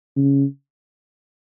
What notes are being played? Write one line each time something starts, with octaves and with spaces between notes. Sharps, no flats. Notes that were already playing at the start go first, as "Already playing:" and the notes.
C#3